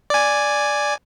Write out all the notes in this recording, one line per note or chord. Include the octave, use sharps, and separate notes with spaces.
D5 G#5